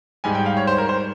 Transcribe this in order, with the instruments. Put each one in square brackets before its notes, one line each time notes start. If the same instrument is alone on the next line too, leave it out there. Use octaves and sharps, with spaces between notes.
[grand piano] G#2 G3 G#5
G5
F5
C#5
C5
A#4
C5